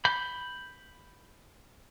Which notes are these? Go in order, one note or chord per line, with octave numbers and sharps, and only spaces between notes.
B5 G6